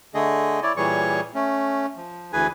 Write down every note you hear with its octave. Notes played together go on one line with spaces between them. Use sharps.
D3 A3 G#4 D#5
E4 C#5 D5
A#2 E3 G3 G#4 C#5 C#6
A3 C#4
F3
D2 E3 G#4 B4 G#5